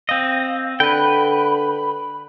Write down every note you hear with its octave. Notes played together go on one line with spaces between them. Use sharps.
C4 D#5 F5
D3 B4 G5 B5